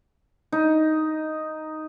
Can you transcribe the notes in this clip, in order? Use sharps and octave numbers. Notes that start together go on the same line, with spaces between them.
D#4